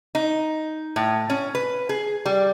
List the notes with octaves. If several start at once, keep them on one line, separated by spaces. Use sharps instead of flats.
D#4
A2
C#4
B4
G#4
G3